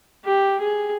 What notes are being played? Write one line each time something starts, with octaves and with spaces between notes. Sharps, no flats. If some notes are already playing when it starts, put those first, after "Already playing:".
G4
G#4